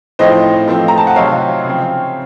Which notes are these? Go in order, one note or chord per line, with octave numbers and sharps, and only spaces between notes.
A2 F3 C4 D#4 C5 D#5
F3 A3 C4
A#5
A5
F#5
C3 F#3 C4 D#4 C#5 F5
C#3 F3 C4